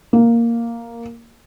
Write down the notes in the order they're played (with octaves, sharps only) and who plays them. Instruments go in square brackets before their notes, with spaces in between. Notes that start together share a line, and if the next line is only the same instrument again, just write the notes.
[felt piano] A#3